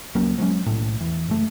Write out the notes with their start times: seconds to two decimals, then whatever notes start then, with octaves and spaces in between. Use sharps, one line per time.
0.15 C#2 F#3 A#3 C#4
0.38 F3 F#3 G#3 C#4
0.66 B1 A2
1.01 E2
1.28 F#1 A3